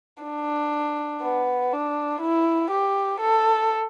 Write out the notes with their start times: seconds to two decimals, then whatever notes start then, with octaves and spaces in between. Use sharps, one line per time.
0.23 D4
1.22 B3
1.73 D4
2.22 E4
2.71 G4
3.21 A4